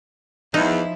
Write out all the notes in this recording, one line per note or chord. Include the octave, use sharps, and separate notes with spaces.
E2 F3 D#4 E4